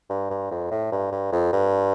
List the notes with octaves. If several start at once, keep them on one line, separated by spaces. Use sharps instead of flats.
G2
G2
F2
A2
G2
G2
F2
G2